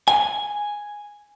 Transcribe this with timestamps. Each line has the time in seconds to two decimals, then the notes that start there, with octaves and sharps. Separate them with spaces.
0.08 G#5